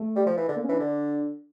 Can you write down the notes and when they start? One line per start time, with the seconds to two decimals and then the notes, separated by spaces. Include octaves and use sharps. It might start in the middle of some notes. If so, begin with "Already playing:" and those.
Already playing: A3
0.16 G3
0.26 F3
0.37 E3
0.48 D3
0.56 A#3
0.64 C#4
0.69 E3
0.72 D4
0.80 D3